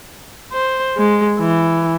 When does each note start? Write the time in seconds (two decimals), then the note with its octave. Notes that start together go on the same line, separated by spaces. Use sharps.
0.52 C5
0.97 G#3
1.39 E3